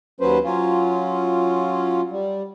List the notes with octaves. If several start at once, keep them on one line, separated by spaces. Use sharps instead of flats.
D#2 F#3 C#4 B4 C5
F#3 C#4 F4
G3